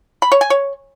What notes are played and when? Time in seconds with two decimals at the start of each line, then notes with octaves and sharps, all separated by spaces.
0.22 B5
0.32 C#5
0.41 G#5
0.50 C#5